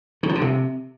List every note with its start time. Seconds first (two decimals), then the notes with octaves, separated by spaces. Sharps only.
0.23 D#3
0.29 F3
0.35 D3
0.41 C3